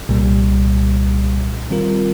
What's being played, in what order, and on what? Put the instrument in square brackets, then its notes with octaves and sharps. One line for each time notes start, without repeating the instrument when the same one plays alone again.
[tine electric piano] C2 A#2 G3
D#3 G3 C4 F4 A#4